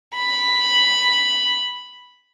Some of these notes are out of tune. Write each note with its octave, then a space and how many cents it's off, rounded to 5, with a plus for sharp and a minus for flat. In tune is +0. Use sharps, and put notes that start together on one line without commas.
B5 +0